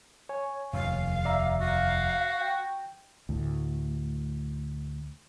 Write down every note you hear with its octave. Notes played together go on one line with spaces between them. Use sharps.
C#5 G#5
F1 D#2 F5
D5 E5 A#5
F#4 F5
G5
D2 A2